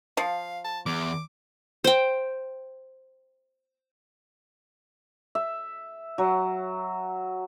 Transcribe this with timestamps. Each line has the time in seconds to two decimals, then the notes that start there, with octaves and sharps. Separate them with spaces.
0.17 F3 F5
0.65 A5
0.86 E2 D6
1.84 C5 G5
5.35 E5
6.18 F#3